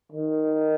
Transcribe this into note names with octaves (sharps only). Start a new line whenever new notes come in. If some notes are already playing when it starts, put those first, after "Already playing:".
D#3